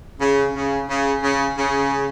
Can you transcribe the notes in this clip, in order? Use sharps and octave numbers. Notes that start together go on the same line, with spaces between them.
C#3
C#3
C#3
C#3
C#3